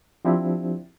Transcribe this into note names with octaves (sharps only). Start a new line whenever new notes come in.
F3 C4 D4 E4 G4